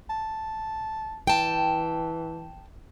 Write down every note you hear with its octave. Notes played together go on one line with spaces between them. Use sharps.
A5
E3 G5 A5